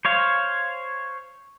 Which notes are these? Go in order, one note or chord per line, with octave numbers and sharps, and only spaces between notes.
C5 C#5 F5